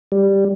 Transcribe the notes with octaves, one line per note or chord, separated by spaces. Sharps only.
G3